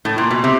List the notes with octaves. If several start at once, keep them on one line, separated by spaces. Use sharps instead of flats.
A2
A#2
B2
C3